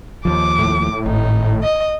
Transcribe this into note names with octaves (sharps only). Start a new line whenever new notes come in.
D#2 F3 D6
A2
G#1 D#4
D#5